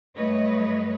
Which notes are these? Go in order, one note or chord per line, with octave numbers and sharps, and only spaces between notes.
G2 F#3 A3 B4 C#5 D#5